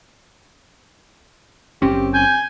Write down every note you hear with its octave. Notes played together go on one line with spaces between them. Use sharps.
F#1 C4 C#4 G4
G#5 G6